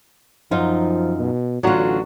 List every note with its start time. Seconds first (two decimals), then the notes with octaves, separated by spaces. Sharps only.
0.51 F#2 F3 D#4 F4
1.19 B2
1.63 A1 D3 F#3 D4 F4 F#4